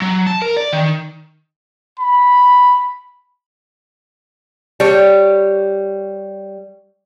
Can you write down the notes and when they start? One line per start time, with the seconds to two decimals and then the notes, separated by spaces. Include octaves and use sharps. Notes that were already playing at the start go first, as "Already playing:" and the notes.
0.02 F#3
0.27 A5
0.42 A#4
0.57 D5
0.73 D#3
2.00 B5
4.80 G3 C#5